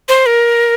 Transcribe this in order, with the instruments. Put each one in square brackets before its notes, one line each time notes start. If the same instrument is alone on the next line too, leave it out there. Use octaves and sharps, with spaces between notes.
[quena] C5
A#4